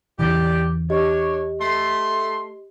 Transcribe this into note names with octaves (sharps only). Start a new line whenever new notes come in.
E2 C#3 E3 G4 D5
D4 G4 C#5 D#5
A3 C6